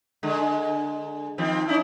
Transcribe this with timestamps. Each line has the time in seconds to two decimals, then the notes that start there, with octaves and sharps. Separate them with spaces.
0.23 D3 G#3
1.38 D#3 F3 C4
1.68 C#4 D#4 E4